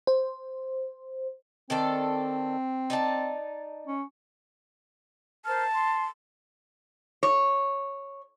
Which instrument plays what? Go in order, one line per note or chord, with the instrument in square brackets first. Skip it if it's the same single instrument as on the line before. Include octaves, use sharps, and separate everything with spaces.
[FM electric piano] C5
[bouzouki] D#3 A4 D5 [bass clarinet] C4
[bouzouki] D#4 D5 A5
[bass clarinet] C#4
[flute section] A#4 C5 F6 [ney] A5
[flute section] C6
[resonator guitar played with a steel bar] C#5